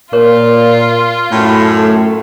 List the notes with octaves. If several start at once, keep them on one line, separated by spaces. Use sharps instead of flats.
A#2 F4 A#4 C#5
F#2 A2 A3